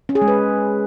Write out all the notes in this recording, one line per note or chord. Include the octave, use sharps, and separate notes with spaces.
C#4
G#4
G#3
B4